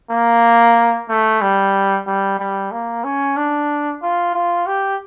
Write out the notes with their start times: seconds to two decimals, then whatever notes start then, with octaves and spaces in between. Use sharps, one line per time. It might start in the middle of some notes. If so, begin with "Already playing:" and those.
0.11 A#3
1.09 A3
1.42 G3
2.07 G3
2.39 G3
2.72 A#3
3.04 C#4
3.37 D4
4.02 F4
4.34 F4
4.67 G4